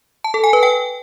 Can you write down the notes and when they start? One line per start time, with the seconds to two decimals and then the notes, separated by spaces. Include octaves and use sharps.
0.24 A5
0.34 A4
0.44 G#5
0.53 B4
0.63 G5